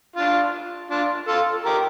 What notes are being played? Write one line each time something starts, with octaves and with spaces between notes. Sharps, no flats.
D4 F4
D4 F4
F4 A4
G4 A#4